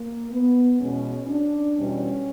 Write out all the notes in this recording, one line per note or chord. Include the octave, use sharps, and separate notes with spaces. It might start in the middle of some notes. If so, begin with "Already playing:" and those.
Already playing: A#3
B3
E2 B2 G#3 C#4
D4
E2 B2 G3 C#4